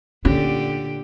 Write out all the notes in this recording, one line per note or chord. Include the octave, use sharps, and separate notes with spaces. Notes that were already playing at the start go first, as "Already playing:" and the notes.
A#2 D3 C#4 G4